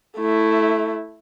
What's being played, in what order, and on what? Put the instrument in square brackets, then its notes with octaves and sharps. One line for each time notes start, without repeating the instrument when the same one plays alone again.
[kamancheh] A3 E4